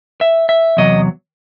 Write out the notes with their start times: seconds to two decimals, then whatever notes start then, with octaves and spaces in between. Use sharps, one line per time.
0.21 E5
0.49 E5
0.77 E2 C3 F#3 D#5